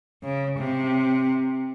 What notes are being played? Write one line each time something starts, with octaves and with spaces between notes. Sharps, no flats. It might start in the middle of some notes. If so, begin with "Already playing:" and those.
C#3
C3